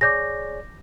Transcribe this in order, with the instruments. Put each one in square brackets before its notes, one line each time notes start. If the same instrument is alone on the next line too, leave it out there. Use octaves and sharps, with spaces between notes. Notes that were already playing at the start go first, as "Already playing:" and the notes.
[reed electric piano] G#4 C#5 D5 [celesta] D6 G6 A#6